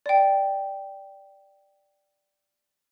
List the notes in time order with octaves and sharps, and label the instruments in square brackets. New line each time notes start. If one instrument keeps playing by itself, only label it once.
[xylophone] D5 G5